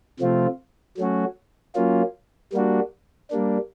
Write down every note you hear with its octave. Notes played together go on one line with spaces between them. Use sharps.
C3 F3 A3 C4 F4
F#3 A3 C#4 F#4
F#3 A#3 C#4 F4
G3 A#3 D4 F#4
G3 A#3 D4